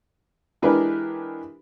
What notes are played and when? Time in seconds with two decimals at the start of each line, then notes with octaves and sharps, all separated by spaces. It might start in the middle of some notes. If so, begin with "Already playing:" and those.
0.62 E3 G#3 D4 G4 A#4 B4